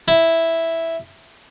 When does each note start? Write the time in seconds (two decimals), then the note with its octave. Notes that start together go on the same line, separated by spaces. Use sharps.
0.08 E4